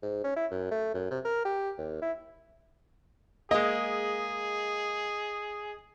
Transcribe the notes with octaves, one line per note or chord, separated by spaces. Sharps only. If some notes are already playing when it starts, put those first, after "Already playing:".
G#2
C#4
E4
F#2
A3
F#2
C3
A#4
G4
D#2
E4
G#3 A#3 G#4 D#5